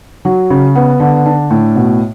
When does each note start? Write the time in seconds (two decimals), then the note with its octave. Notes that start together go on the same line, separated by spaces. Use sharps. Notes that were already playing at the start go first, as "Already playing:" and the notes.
0.25 F#3
0.50 C#3
0.75 B3
1.00 D3
1.25 D4
1.50 A2
1.76 B2